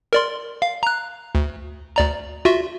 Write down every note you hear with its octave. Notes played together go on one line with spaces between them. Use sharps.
A#4 D5 C6
F5
A#5 F#6
D2
D2 D5 A#5
F4 F#4 E5